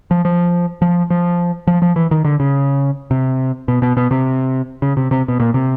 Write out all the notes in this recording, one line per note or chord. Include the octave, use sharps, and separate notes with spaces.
F3
F3
F3
F3
F3
F3
E3
D#3
D3
C#3
C3
B2
B2
B2
C3
C#3
C3
C3
B2
A#2
C3